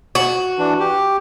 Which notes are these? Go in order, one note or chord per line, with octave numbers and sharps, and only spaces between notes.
F#4
E3 D4
G4